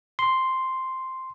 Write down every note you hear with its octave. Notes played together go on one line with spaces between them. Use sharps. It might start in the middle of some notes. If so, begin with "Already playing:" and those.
C6